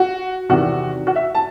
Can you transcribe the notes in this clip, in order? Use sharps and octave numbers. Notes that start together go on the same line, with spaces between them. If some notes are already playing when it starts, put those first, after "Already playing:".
Already playing: F#4
E2 C3 D#3 F#4
F#4
E5
A5